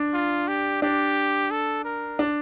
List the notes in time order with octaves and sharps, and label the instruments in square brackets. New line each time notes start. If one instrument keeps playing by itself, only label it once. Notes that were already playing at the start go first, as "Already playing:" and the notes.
Already playing: [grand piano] D4
[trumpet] F4
G4
[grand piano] D4 [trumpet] G4
[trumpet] A4
A#4
[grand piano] D4